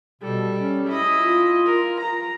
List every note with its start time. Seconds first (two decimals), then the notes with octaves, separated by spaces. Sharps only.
0.22 B2 G3 A4
0.56 C#4
0.87 E4 D#5
1.17 F4
1.66 A#4
2.01 A#5